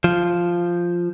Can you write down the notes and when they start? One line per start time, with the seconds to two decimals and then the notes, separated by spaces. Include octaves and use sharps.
0.04 F3